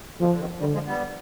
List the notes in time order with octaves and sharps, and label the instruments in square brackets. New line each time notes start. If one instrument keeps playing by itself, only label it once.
[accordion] B2 D3 [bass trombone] F3
[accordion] D3
C3 D#3
[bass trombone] D3 [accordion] D#3 G3
[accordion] F3 G#3
G3 B3